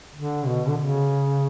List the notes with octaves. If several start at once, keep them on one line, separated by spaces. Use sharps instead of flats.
D3
B2
D3
C#3